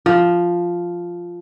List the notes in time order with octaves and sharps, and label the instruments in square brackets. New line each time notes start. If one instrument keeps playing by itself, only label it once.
[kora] F3